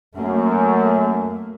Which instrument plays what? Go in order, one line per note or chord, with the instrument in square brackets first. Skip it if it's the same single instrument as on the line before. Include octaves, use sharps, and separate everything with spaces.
[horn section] F#2 [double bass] A3 A#3